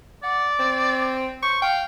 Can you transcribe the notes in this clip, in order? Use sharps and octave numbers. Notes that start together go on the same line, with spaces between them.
D5 F#5
C4
C5 C#6
F5 G5